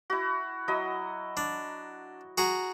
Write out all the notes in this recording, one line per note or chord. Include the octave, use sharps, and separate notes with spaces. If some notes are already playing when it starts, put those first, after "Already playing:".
E4 F#4
F#3 E4 D#5
D4
F#4 G#4 A#5